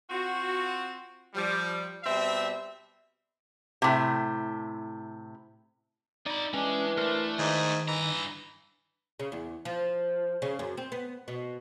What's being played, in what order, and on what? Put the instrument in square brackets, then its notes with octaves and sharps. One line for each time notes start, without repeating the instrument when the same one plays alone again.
[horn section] C4 F4 F#4
F3 G3
B2 G3 C4 E5
[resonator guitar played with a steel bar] A2 C3
[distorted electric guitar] D#4 B5 [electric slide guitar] D5
[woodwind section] E3 D4 [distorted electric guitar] G#3 [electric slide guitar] C#4
[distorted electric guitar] A3 [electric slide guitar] A#4 C5
[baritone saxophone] G#2 [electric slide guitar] D#3
[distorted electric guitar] G2 A#5 [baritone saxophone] E3
[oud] C#3
E2
F3
C#3
F#2
C4
B3
B2